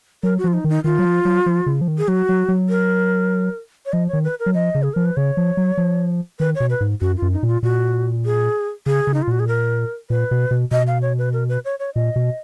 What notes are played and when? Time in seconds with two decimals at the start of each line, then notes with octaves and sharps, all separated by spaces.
0.23 F#3 A#4
0.38 F#4
0.44 F3 F4
0.53 D#4
0.64 D#3 D#4
0.84 D#3 F4
0.99 F#3
1.05 F3
1.25 F#3
1.46 F3
1.66 C#3
1.81 F3
1.88 D#3
1.98 G#4
2.08 F#3 F#4
2.29 F#3
2.48 F#3
2.69 A#4
3.86 C#5
3.93 F3 D#5
4.08 C#5
4.13 D#3
4.24 B4
4.40 A#4
4.46 F#3
4.54 F3 D#5
4.75 C#3
4.83 G#4
4.94 F3 A#4
5.05 B4
5.17 C#3 C#5
5.37 F3
5.57 F#3
5.77 F3
6.39 D#3 B4
6.55 C#5
6.60 B2
6.70 B4
6.80 G#2
7.01 F#2 F#4
7.17 F4
7.22 F#2
7.33 D#4
7.43 A#2 F4
7.63 A#2 F#4
8.25 G#4
8.86 C#3 G#4
9.07 C#3
9.14 D#4
9.22 F4
9.27 A#2 F#4
9.40 G#4
9.48 A#4
10.10 A#2 B4
10.31 B2
10.51 B2
10.71 B2 D#5
10.87 F5
11.02 C#5
11.18 B4
11.33 A#4
11.49 B4
11.65 C#5
11.79 C#5
11.95 A#2 D#5
12.16 B2